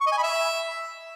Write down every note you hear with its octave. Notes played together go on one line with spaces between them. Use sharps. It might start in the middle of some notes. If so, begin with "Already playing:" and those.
C#6
D#5
G#5
B5
E5